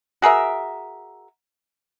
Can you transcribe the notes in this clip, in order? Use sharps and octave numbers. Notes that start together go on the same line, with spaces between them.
F#4 G#4 A#4 E5